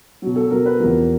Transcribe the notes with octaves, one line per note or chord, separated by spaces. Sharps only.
B2 F#3
A4
B2 F#3 A#4
B4
E2 C3 F3 A#4